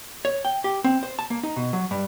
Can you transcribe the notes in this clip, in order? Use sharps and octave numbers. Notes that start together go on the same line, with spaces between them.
C#5
G5
G4
C4
C5
A5
A#3
D#4
B2
F#3
G2